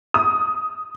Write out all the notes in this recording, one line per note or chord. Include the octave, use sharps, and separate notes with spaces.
D#6